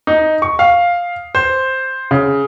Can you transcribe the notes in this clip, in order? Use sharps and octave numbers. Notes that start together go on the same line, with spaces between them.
D#4
C#6
F5
C5
C#3